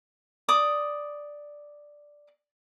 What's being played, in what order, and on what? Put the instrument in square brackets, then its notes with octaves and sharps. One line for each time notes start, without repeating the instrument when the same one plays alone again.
[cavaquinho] D5 D6 D#6